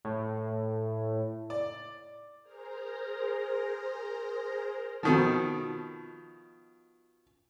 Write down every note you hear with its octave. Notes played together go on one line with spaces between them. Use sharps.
A2
D5
G#4 A#4 C5 A#5
B2 D#3 F3